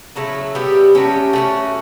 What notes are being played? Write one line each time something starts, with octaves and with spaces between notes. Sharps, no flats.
C#3 F#3 A3 E4
G3 B3 E4 G4
F#3 A3 C#4 G4
A3 C#4 F#4